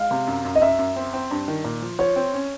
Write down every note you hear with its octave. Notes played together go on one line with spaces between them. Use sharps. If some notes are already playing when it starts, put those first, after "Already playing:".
Already playing: G#3 F5
C3
F#2
F#2
D#5
F#2 E5
F#2
C4
C4
G2
D#3
A#2
F3
F3 C#5
C4
C#4